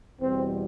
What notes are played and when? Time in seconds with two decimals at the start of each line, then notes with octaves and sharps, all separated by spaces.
0.20 E2 B2 G3 C4